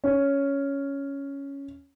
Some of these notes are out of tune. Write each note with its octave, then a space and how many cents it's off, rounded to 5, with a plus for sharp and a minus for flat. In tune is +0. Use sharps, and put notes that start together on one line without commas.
C#4 +5